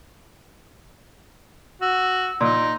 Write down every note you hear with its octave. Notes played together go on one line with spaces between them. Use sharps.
F#4 E6
A#2 D#4 C6